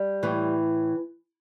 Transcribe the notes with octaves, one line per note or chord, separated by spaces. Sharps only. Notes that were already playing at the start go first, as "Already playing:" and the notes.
Already playing: G3
A2 E3